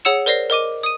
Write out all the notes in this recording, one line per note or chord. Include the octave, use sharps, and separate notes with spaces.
G#4 C#5 F#5 E6 C#7 E7
A#4 C5 D5 A#6 C7
A#4 D#5 D6 D#7
D#6 D#7